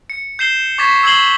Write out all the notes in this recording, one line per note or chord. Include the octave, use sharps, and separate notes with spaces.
C#7
G6 C7 E7 G7
C#6 D6 G#6 A6 B6
E6 G#6 C7 F#7 G7